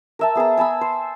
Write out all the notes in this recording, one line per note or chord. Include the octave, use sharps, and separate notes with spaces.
A#4 E5 A5
B3 G#4 A5 A#5
G#5 A5 B5 E6
C5